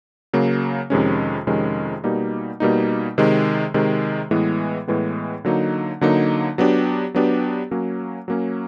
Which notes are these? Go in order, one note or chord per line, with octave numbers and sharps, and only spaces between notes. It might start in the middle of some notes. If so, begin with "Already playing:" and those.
C#3 F#3 A#3
F2 C3 D#3 G#3 C#4
F2 C3 D#3 G#3 C#4
B2 G3 A#3 D#4
B2 G3 A#3 D#4
C3 D#3 G#3
C3 D#3 G#3
A2 E3 G#3 B3
A2 E3 G#3 B3
D3 F#3 A#3 D#4
D3 F#3 A#3 D#4
F#3 B3 D4 G4
F#3 B3 D4 G4
F#3 A#3 C#4
F#3 A#3 C#4